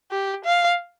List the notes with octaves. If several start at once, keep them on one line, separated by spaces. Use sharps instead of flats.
G4
F5